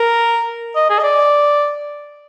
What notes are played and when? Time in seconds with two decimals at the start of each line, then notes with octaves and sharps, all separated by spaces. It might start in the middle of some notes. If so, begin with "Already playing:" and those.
Already playing: A#4
0.75 D#5
0.89 G#4
0.99 D#5
1.03 D5